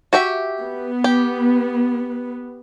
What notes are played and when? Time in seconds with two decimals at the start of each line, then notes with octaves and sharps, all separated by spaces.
0.13 F#4 G4 E5
0.62 B3
1.04 G4